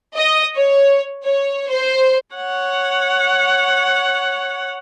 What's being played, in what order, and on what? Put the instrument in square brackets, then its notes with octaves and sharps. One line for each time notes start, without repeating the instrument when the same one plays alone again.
[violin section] D#5
C#5
C#5
C5
[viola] C#5 F#5